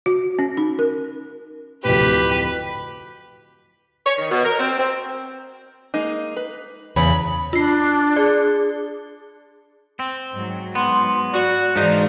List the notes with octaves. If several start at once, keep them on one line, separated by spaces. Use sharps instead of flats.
F#4
C#4
D#4
A#4
D1 F2 A2 G4 B4 B5
C#5
D#3
B2
A#4
C4
C4
G#3 A#3 D#4
B4
E2 C#3 C#5 B5
D4 F4 C7
G#4 D5
C4
G#2 F#3
B3 C6
F#4 D5
G#2 E3 F3 G#3 D#4 D5